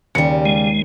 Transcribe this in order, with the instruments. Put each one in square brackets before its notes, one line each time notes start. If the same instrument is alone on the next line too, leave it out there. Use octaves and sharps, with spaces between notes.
[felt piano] D#2 C#7 [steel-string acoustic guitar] C#3 G3
[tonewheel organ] G#3